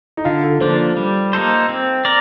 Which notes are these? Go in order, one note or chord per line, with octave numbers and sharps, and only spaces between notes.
D#4
D3 F4
A4
F3 A#3 D4 C5
G3
A#3 D#4 A4 C5
C4
A#4 D5